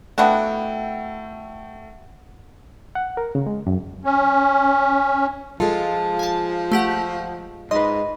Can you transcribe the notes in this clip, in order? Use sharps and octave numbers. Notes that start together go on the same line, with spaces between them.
A3 B3 D4 E4 F#4 G5
F#5
A#4
C#3
G#3
F#2
C#4
F3 G#3 F4 A4
G#5 A5
A3 G4 F#5
G#2 B4 D#5 C6